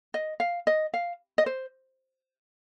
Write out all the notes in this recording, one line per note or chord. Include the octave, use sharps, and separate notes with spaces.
D#5
F5
D#5
F5
D#5
C5